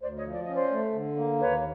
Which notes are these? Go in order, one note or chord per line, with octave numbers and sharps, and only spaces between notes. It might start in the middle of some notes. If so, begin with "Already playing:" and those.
D2 C5 D5
C#5 D#5
F3
D5
C#4 D#5
C5 D5
A3
D3
A#3
D#2 B4 C#5